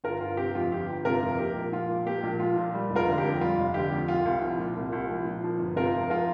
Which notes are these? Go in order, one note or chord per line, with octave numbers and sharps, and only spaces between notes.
G1 F4 A#4
G1 F4
C3 G4
F2 F4
G1 G4
G1
C3 F4 A#4
F2
A#3 G4
A#1
F3 F4
A#2
A#3 G4
A#1
F3 F4
A#2
G3
F1
F4 A#4
D3
G4
F2
G3 F4
F1
D3 G4
F2
C2 F4
C2
F3
A#2
C2
C2
F3
A#2
F3
G1
C3 F4 A#4
F2
F3 F4 A#4